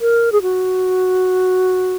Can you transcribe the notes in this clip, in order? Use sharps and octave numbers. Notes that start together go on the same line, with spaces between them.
A#4
G#4
F#4